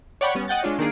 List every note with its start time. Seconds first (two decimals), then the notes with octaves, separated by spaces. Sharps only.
0.21 C#5 D5 F#5 G5 B5 C#6
0.35 G3 B3 C#4
0.48 D#5 F#5 G5 A6
0.63 G#3 D4 F4 C#5
0.79 D#3 A#3 D4 G#4 C7 D7